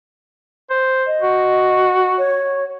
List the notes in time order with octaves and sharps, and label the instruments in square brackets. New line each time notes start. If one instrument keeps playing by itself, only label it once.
[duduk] C5
[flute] D#5
[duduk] F#4
[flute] C#5